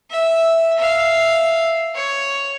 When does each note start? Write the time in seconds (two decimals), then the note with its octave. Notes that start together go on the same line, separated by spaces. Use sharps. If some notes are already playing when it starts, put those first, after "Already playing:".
0.11 E5
0.78 E5 F5
1.95 C#5